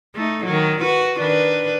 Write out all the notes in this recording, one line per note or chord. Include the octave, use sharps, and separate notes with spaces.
A3 D#4
D#3 F#3
F#4 B4
D#3 D4 B4